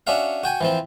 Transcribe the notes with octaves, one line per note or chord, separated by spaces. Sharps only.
C#4 D4 F#4 E5 F5
F#4 G5 G#5
E3 F3 C4